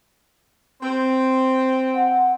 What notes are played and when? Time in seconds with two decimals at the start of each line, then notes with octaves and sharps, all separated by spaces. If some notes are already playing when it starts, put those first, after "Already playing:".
0.81 C4
1.95 F#5